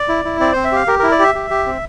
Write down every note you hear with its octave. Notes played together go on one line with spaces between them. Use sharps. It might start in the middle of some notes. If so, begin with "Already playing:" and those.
Already playing: D5
E4
E4
C4 D5
C4 C5
E5
G4 F5
G4 A#4
E4 A#4
D5
G4 E5
G4
G4
C4